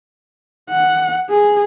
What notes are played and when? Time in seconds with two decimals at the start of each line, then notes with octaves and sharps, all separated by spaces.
0.70 F#5
1.29 G#4